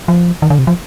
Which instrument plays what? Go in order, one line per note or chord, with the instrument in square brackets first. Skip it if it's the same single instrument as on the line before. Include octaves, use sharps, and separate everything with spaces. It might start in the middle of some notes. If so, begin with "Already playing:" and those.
[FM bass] F3
D#3
D3
C3
F3